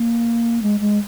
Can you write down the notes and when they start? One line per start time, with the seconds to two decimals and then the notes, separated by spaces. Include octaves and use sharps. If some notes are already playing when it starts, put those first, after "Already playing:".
Already playing: A#3
0.63 G#3
0.80 G#3